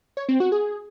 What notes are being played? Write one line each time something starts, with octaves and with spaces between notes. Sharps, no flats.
C#5
C4
F#4
G#4